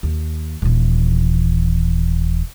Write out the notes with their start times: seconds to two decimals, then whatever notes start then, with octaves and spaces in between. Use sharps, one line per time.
0.03 D#2
0.62 D#1 E3